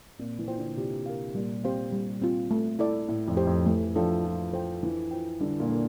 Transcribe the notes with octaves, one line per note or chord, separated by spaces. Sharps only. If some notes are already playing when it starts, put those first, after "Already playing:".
A#2 C4
E3
F4 C5 G5
D3
C3 F4
A#4 F5
A#2 G3
C4 G4 C5 F5
G3
C4 F4
A3
E4 A4 D5
A2 E4
F2
G4 C5 G5
F2
E3 A3
F3 D4 A4 E5 G5
F4
A4 C5 G5
E3 D4
F4 C5 G5
D3 G3
A#2
A#3 D4 A4